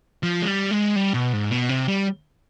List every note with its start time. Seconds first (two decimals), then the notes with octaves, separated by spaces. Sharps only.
0.23 F3
0.42 G#3
0.47 G3
0.71 G#3
0.96 G3
1.14 B2
1.33 G#2
1.51 B2
1.69 C3
1.88 G3